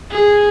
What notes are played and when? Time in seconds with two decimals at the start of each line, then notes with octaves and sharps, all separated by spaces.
0.12 G#4